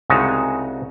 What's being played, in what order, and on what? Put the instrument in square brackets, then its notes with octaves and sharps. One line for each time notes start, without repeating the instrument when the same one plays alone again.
[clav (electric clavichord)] C2 C#3 G#3 D#4 F#4 A5